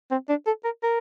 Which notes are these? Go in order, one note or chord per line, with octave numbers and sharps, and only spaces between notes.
C4
D4
A4
A#4
A#4